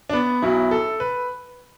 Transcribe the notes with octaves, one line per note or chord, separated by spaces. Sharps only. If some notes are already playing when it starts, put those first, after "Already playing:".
D4
B3
B1 B2 F#3 E4
A4
B4